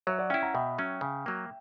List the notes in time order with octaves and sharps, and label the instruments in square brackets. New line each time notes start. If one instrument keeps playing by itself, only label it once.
[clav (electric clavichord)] F#3 [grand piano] C#5 E5
[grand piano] D5 F#5
[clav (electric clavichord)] C#4 E4 [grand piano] E5 G5
[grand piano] F#5 A#5
[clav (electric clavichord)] B2 [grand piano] E5 G5
[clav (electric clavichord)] F#3 C#4
C#3
F#3 A#3